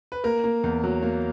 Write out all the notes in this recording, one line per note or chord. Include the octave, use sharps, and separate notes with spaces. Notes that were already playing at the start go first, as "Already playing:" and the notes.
B4
A#3 A#4
A#3
E2
F#3
A#3